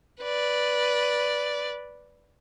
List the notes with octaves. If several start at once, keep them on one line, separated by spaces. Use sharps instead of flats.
B4 D5